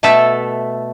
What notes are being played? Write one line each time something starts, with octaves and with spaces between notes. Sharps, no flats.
B2 A3 A4 E5